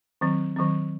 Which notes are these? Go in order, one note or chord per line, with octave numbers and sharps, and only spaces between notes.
D#3 F#3 C4
D#3 F#3 C4